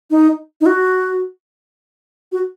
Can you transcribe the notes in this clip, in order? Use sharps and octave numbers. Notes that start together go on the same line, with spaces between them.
D#4
D#4
F#4
F#4